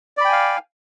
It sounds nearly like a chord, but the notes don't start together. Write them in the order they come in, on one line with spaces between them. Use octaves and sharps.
D5 B5 G5 G#5 F5